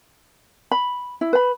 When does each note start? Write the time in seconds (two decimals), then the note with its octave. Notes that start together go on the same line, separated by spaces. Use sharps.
0.72 B5
1.21 E4
1.33 B4 B5